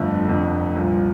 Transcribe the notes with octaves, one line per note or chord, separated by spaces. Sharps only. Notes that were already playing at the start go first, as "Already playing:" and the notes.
Already playing: G1 F2 D3 A3
F1 F2 D3
C2 A#2 F3